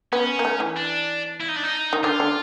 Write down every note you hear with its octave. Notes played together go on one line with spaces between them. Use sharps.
B3 C#4
A#3
A3
E3
D4
E4
D#4
D4
D#4
D#3
D3 F4
D3